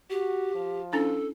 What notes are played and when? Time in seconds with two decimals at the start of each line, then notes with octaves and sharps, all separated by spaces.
0.10 F#4 G4
0.55 F3
0.93 C#4 D4 E4 A4